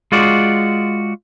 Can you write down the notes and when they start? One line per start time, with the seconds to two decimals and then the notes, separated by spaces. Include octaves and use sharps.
0.12 G#3 F4 F#4 D5